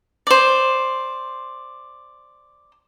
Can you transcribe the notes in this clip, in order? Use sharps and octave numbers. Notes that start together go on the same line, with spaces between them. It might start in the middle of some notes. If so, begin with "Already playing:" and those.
C5 D5